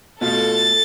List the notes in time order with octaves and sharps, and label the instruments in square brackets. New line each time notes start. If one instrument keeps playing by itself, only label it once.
[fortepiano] B2 A3 F4 [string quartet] A4 A6